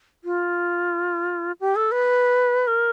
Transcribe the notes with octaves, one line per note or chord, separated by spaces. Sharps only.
F4
G4
A4
B4
A#4